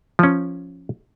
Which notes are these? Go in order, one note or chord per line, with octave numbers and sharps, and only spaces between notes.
F3 C#4